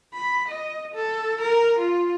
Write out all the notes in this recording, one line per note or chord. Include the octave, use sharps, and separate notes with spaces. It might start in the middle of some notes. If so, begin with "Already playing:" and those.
B5
D#5
A4
A#4
F4